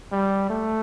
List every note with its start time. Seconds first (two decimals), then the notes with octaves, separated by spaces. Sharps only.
0.12 G3
0.50 A3